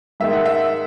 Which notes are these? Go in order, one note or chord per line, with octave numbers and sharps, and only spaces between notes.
G#2 D#3 G#3 E5
F#5
E5